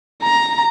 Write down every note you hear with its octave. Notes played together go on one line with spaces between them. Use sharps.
A#5